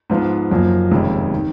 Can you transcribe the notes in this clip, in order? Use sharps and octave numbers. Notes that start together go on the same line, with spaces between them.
G#2 F3 B3 F4
F#1 F#2 F3 A#3
F1 D#2 C#3 G#3
D#3